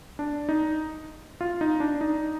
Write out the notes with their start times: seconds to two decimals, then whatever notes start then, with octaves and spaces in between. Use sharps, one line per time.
0.19 D4
0.49 D#4
1.41 F4
1.61 D#4
1.80 D4
2.01 D#4